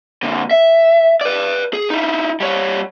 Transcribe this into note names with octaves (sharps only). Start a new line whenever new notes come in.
A#2 D3
E5
B4 D5
G#4
D#4 E4
G3 C#5